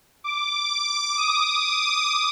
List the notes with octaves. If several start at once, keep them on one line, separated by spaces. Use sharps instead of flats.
D6
D#6